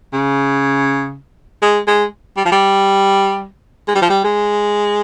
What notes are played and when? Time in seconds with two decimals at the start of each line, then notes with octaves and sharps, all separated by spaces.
0.13 C#3
1.62 G#3
1.87 G#3
2.37 G3
2.45 F3
2.52 G3
3.88 G#3
3.95 G3
4.02 F3
4.10 G3
4.24 G#3